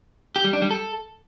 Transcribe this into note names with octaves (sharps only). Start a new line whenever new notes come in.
G4
G3
D4
G3
A4